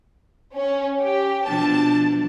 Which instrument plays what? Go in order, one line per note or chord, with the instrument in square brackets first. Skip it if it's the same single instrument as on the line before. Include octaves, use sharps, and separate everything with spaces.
[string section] C#4
G4
[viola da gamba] B2 F3 D4 [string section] A5